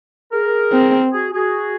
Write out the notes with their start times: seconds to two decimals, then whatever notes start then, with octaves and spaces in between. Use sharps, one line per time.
0.32 G#4 A#4
0.72 C4
1.12 F#4 G#4
1.32 F#4 G#4